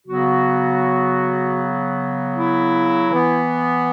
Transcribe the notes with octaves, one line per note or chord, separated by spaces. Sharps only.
C#3 F#3 B3 F#4
E4
E3 B3